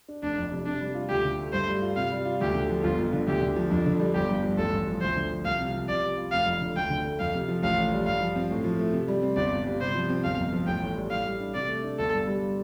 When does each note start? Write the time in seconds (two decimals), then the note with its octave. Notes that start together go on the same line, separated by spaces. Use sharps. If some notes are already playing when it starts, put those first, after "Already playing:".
0.08 D4
0.22 F1 D4
0.38 F2
0.51 C3
0.66 C3 D4
0.81 G3
0.95 F4
1.09 D2 G4
1.24 D3
1.39 A3
1.53 G2 C5
1.68 G3
1.82 F4
1.96 C3 F5
2.11 G3
2.25 F4
2.40 D2 G4
2.54 D3
2.69 F3
2.83 G1 F4
2.98 F2
3.13 D3
3.27 D2 G4
3.41 D3
3.56 F3
3.70 F2 D4
3.86 D3
3.99 G3
4.14 G1 G4
4.29 G2
4.44 F3
4.57 A1 A4
4.73 G2
4.87 F3
5.02 D2 C5
5.16 D3
5.31 F3
5.45 C2 F5
5.60 C3
5.74 F3
5.89 C3 D5
6.03 G3
6.17 F4
6.32 F1 F5
6.46 F2
6.61 D3
6.76 D2 G5
6.90 D3
7.04 A3
7.19 F2 F5
7.34 C3
7.48 F3
7.63 A1 F5
7.78 A2
7.92 G3
8.07 G2 F5
8.21 F3
8.36 C4
8.50 A2
8.64 F3
8.79 A3
8.93 C3
9.08 G3
9.22 C4
9.36 G1 D5
9.51 G2
9.67 G3
9.80 C3 C5
9.95 F3
10.09 C4
10.24 G1 F5
10.38 F2
10.53 F3
10.67 A1 G5
10.82 A2
10.96 G3
11.11 A2 F5
11.26 G3
11.40 D4
11.54 C3 D5
11.69 A3
11.84 D4
11.99 G1 A4
12.13 G2
12.27 G3